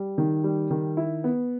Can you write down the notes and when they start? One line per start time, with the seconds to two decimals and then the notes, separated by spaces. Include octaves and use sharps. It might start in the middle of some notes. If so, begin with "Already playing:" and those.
Already playing: G3
0.18 D#3
0.44 G3
0.71 D#3
0.97 E4
1.24 B3